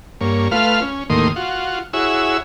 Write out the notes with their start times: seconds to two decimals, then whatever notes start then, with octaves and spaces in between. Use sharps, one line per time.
0.21 G2 A#3 C#5
0.51 A3 F4 B4 F5 F6
0.82 C#4
1.10 D#2 A2 D#3 A#3 C6 D#6
1.36 F4 F#4
1.93 E4 F#4 G#4 C#5 E6